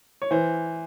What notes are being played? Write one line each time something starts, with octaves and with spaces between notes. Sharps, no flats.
C#5
E3 C5